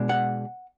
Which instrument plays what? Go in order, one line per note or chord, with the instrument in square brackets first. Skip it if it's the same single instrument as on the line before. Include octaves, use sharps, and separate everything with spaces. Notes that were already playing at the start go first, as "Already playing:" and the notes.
Already playing: [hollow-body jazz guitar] B2 G#3 D4
F#5